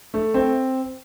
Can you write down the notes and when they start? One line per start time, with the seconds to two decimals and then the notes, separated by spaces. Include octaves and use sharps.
0.14 A3
0.34 C4